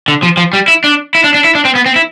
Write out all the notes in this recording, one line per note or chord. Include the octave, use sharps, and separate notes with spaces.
D3
F3
F3
G3
E4
D4
E4
D4
D4
E4
D4
C4
B3
C4
E4